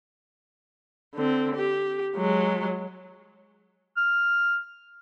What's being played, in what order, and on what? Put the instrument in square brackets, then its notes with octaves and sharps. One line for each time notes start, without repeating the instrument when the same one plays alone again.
[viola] D3 C4
G4
F#3 G#3
[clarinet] F6